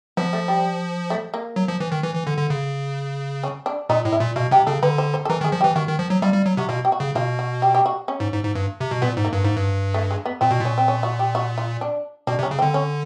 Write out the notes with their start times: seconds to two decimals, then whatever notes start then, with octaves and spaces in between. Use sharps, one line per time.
0.17 F3 B3
0.33 A3
0.48 G3
1.10 A3
1.34 A#3
1.56 F#3
1.68 F3
1.80 E3
1.92 D#3
2.03 E3
2.15 E3
2.27 D3
2.38 D3
2.50 C#3
3.43 C#4
3.66 D4
3.89 A#2 D#4
4.05 A2
4.13 E4
4.20 A#2
4.36 B2 F4
4.51 C3 G4
4.67 C#3 A4
4.83 D3 B4
4.98 C5
5.14 C5
5.25 A4
5.30 E3 A#4
5.41 D#3
5.44 G#4
5.52 F3
5.61 G4
5.64 E3
5.76 D#3 F#4
5.88 D#3
5.99 F3
6.10 F#3
6.22 G3 F4
6.34 G3
6.46 F#3
6.57 C3 F#4
6.69 B2 F4
6.85 G4
6.92 F#4
7.00 C#3
7.15 B2 F4
7.39 F#4
7.62 G4
7.75 G4
7.86 F#4
8.08 C#4
8.20 G#2
8.32 G#2
8.44 G#2
8.55 G2
8.81 C3
8.91 B2
9.02 A#2 B3
9.17 G#2
9.25 A#3
9.33 G2
9.44 G#2
9.56 G2
9.94 A3
10.11 G#3
10.25 B3
10.41 A#2 C4
10.51 B2
10.60 A#2 C#4
10.78 C4
10.88 C#4
11.03 F#4
11.19 G4
11.35 F#4
11.58 F4
11.81 D4
12.27 B2 D4
12.39 C3
12.43 C#4
12.51 C#3
12.59 C4
12.62 D3
12.74 C#4